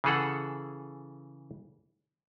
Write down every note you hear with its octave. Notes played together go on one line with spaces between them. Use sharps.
C#3 E3 G#4 A4 F#5